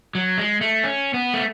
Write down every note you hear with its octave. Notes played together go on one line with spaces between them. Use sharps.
F#3
G#3
A3
C#4
B3
A3